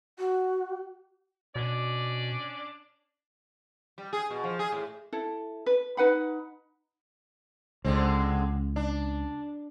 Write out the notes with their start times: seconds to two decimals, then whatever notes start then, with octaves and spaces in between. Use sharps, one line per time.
0.19 F#4
1.56 B2 C#4 D4 D5
3.98 G3
4.13 G#4
4.30 B2
4.43 F3
4.59 G#4
4.72 A2
5.13 E4 A4
5.66 B4
5.97 D#4 B4 F#5 B5
7.85 C#2 D3 G#3 C4
8.76 D4